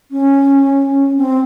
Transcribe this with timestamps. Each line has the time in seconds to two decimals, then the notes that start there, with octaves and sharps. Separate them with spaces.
0.11 C#4
1.17 C4